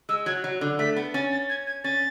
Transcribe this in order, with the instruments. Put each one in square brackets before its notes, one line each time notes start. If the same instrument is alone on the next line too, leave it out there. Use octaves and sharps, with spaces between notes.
[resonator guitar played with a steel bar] G#3 [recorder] E6
[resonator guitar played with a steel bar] F#3 [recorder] G#6
[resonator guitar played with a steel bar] F#3
D3
[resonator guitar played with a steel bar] A3 [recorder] B6
[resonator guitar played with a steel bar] B3
[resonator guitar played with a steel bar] C#4 [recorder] A6
[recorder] A6
G#6
G#6
[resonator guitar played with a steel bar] C#4 [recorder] A6